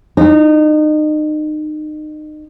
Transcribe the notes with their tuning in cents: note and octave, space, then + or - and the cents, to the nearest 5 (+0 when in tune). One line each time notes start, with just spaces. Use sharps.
D#4 -30